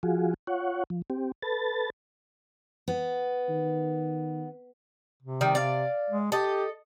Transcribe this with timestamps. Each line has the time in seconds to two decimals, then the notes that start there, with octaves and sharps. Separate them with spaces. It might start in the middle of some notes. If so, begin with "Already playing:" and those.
0.03 F3 F4 F#4 G#4
0.47 F4 C#5 F#5
0.90 F3
1.10 C4 G4
1.42 A4 B4 A6
2.88 B3
3.49 D#3
5.23 C3
5.41 D#3 G3
5.55 D5 F5
6.10 G#3
6.32 G4 A4 D#5